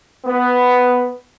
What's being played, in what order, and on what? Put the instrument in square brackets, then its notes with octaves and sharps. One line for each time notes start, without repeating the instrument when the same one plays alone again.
[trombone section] B3